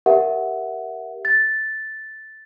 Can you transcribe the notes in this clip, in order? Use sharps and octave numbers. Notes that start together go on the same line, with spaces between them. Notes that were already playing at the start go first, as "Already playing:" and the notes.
G4 A#4 E5 F#5
A6